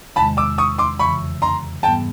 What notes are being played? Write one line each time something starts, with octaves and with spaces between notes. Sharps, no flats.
E2 C3 D#3 G#3 A5 B5
D6 E6
C#6 D#6
C6 D6
F2 C#3 E3 B5 C#6
A#5 C6
G#2 E3 G3 B3 G5 A5